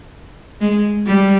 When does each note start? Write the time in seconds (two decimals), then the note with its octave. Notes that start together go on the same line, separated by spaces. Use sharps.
0.61 G#3
1.06 G3